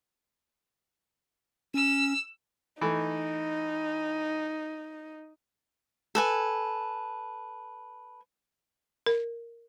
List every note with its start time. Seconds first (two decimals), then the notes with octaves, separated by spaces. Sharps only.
1.74 C#4 E6
2.81 E3 A3 D#4
6.15 A4 B4 G#5
9.06 A#4